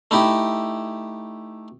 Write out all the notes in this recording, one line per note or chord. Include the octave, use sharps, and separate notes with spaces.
A3 D#4 E4 G4